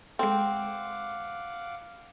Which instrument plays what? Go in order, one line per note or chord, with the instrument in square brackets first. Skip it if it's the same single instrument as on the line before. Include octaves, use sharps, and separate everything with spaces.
[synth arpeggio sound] G#3 A4 [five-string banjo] C4 [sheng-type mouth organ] F5 F#5 D6